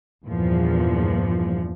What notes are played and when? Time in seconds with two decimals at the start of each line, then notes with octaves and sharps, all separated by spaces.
0.25 E2 G2 A#2 F3